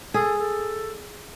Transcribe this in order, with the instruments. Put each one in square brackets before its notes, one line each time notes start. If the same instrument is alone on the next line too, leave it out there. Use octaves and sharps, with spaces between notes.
[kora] G#4 [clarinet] A4
[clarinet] A4